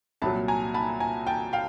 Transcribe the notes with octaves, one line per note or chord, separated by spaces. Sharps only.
C2 A#2 F#3 A5 B5
G#5 A#5
A5 B5
G#5 A#5
G5 A5
F5 G5